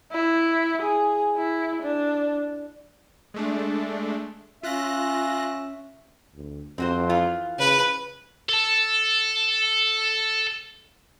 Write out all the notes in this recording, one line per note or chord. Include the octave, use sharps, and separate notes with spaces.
E4
G#4
E4
D4
G#3 A3 D4
C#4 F4 E5 F#6 A#6
D2
F2 C4 F#4 C5
E3 F4
C#3 B4
A4 A5